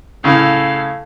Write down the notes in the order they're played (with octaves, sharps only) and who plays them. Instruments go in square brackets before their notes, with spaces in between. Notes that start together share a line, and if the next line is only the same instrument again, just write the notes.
[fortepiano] A2 C#3 [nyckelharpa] A4 F5